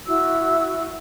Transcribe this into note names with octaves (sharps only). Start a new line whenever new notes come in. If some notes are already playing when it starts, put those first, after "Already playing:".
E4 F#4 E6